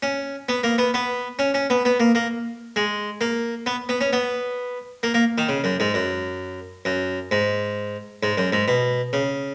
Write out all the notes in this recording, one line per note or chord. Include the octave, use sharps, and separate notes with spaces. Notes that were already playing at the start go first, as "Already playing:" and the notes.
C#4
B3
A#3
B3
B3
C#4
C#4
B3
B3
A#3
A#3
G#3
A#3
B3
B3
C#4
B3
A#3
A#3
D#3
C#3
F#2
G#2
F#2
F#2
G#2
G#2
F#2
G#2
B2
C#3